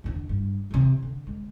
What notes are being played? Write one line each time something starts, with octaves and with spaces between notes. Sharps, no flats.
E2 D3
G2
E2 C3
D3
G#3